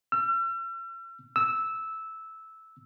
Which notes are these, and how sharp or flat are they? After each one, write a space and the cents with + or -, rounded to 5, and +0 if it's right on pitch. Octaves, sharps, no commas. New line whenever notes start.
E6 +45
E6 -10